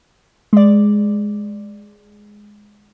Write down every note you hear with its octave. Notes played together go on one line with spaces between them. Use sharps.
G#3 D5